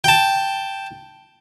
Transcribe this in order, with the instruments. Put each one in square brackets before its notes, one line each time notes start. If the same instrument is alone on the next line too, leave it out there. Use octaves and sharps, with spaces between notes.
[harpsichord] G5 A5